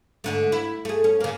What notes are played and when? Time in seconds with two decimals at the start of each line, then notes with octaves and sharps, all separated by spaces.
0.24 G#2 D3 A3
0.52 E4
0.85 A3 G#4
1.04 C#4
1.20 C#3 A#3